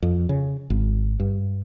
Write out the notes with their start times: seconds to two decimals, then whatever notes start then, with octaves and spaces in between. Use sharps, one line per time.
0.02 F2
0.29 C#3
0.70 G#1
1.20 G2